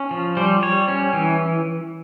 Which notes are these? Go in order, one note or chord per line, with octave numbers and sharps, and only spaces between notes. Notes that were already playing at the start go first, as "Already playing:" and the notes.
Already playing: C#4
F3
G3 C5
G3 C#5
C#4
E3